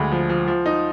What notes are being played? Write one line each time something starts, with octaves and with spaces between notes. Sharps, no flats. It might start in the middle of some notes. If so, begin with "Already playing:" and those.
Already playing: D2 G#3 B5
F3
F3
F3
D#4